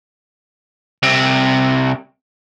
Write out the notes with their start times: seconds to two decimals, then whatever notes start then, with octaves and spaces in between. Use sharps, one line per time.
1.03 C2 C3